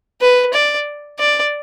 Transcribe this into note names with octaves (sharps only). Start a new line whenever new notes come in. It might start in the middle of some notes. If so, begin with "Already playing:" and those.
B4
D5
D5